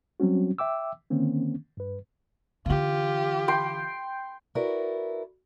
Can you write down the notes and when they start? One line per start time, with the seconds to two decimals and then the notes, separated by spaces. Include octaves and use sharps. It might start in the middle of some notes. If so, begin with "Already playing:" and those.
0.20 F#3 G3 C4 C#4 F#4
0.58 E5 G5 D6 E6
1.10 D3 D#3 A#3 C4 C#4
1.77 G2 B4
2.66 D3 E3 F4 G4
3.48 G5 C6
4.55 E4 F#4 A#4 B4 D5